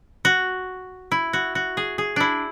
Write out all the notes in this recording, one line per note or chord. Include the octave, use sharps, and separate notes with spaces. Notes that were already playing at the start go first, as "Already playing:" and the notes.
F#4
E4
F#4
F#4
G#4
G#4
D4 E4